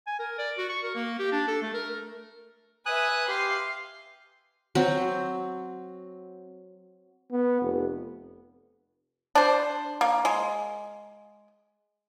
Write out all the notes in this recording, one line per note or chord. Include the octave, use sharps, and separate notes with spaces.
G#5
A#4
D5
F#4
C#6
A#4
A#3
G4
D4
A4
A3
A#4
B4 E5 G#5 D#6 F#6
G4 F5 C6
F#3 C4
B3
F1
D4 C5
A#3
G#3